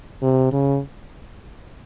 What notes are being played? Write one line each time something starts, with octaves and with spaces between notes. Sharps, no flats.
C3
C#3